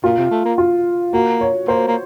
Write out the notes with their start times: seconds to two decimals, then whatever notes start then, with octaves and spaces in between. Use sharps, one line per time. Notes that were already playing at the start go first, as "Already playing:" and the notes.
0.04 A#2 F4
0.18 C3
0.31 A3
0.45 A#3
0.58 F4
1.13 A#3 F#4
1.41 C#5
1.68 A#3 C5
1.87 A#3